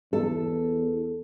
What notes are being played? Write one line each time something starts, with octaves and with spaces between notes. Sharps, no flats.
E2 A4